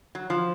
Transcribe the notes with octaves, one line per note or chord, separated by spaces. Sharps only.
F#3
F3